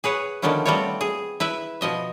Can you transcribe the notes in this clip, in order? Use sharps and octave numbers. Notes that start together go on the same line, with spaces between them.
G#4 B4 C#5 F#5
D3 D#3 F3 B3 C#4 E4
G3 A3 B3 C4 F4 C#5
G#4
E4 B4 E5
B2 F3 D#5 E5